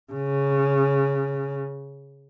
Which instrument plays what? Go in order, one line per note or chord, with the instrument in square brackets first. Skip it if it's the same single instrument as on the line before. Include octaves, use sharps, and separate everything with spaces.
[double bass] C#3